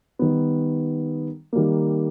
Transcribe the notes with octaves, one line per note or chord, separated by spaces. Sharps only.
D#3 G3 B3
D#3 G3 A#3